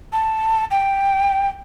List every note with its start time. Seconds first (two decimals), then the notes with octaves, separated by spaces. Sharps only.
0.12 A5
0.71 G5